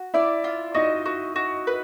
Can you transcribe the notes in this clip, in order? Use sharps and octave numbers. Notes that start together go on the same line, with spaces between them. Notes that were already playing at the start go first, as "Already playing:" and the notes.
Already playing: F#4
E4 D5 E5
F4
D#4 F#4 D#5
F#4
F#4
B4